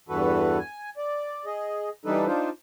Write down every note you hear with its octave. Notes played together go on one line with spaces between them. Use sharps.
E2 G2 E3 F#4 A4 B4
G#5
D5
G#4 D#5
E3 G3 D4 D#4 A4 B4
D4 D#4 F4 C5